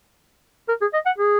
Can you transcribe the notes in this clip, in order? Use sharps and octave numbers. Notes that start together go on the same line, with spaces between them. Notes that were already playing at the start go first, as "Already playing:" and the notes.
A#4
G#4
D#5
F#5
G#4